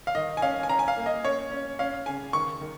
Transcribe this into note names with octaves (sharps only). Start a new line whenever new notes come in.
F5
D#3 D#5
G#5
C#4 F5
G#5
C#4 A#5
G#5
F5
A#3
D#5
C#4 C#5
C#4
C#4 F5
C#3 G#5
D#3 C#6
D#3